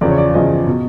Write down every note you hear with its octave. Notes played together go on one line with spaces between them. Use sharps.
E2 C#3 F3 D5
C#5
D5
E2 C#3 F3 D#5
B2